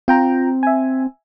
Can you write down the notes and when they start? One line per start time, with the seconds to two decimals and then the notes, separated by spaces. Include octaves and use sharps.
0.08 C4 F4 G5 A#5
0.63 E5 G#5